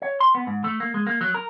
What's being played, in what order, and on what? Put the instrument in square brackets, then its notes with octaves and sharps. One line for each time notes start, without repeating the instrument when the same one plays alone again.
[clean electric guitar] C#5
C6
B3
G#2
A3
A#3
G#3
A#3
F#3
A#4